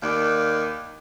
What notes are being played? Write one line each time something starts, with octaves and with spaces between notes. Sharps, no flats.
D#2 D#3 D5 F5